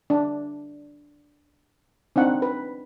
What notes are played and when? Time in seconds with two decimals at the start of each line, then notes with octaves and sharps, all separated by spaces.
0.10 D4
2.16 C4 D4 D#4 F#5
2.42 B4